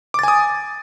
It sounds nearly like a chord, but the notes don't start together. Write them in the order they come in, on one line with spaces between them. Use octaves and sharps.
D6 A6 G#5 D#6